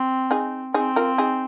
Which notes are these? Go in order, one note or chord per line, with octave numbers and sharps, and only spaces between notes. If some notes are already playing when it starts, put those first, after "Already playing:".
Already playing: C4
D#4 G#4
C4 D#4 G#4
F4 A#4
D#4 G#4